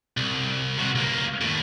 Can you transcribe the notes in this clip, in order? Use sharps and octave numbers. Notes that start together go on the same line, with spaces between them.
C2
C3 F#4
C#2 A#3
D#2 A2